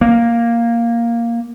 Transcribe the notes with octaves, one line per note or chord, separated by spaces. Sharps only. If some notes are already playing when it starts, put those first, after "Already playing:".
A#3